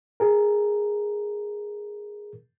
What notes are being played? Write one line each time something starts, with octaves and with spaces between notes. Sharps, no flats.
G#4 A#4